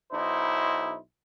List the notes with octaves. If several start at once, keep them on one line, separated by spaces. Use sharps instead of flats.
B1 D#4 E4 C5